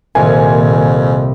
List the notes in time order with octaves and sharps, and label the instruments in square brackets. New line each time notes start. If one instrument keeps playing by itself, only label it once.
[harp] C2 [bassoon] F2 [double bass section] A#2 D#3 [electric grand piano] G#5